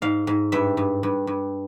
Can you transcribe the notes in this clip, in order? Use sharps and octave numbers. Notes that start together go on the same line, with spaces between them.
G#2 F5
G#2
G2 E5
G2
G2
G2